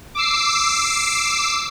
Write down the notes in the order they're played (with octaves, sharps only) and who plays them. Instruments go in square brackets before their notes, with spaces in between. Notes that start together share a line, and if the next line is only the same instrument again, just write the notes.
[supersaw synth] D6 E6 C7